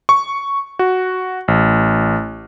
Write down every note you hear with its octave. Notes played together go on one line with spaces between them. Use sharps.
C#6
F#4
A1